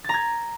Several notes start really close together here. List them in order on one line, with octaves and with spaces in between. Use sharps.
A6 A#5 G#6